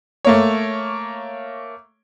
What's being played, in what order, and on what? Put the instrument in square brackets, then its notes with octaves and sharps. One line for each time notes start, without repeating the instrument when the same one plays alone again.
[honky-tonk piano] A3 A#3 C#5